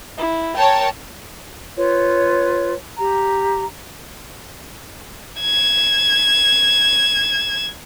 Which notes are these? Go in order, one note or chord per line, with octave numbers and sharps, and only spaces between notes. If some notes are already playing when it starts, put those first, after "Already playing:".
E4
A#4 C#5 G5 A5
F4 B4 C#5
G4 A#5
G#6 E7